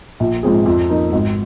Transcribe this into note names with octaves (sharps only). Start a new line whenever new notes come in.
A#1
G#2 F3 C4 G#4
F2
F3 A#3 D#4
G#1